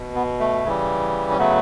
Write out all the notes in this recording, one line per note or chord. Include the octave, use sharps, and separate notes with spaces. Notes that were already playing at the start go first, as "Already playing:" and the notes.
Already playing: B2
B3
A3
C#3 E3 G3
C#4
C#3 F#3 A3 B3